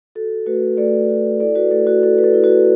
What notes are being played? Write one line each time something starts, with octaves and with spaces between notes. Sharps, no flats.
F#4 A4
A3 F#4 B4
A3 A4 D5
F#4
E4 A4 D5
F#4 B4
A3 A4
F#4
E4 A4
B4
A4
E4
F#4 B4